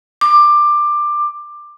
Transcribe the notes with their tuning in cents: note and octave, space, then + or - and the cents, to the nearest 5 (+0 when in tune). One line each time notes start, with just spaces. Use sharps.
D6 +15